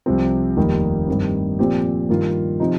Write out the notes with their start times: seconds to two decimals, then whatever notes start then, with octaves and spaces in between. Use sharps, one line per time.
0.06 C2 C3 F3 C4
0.57 F1 D#2 D#3 G3 A#3
1.08 G2 D#3 C4
1.59 A#2 F3 C4 G4
2.09 G2 D#3 A#3 F4
2.60 C3 F3 D#4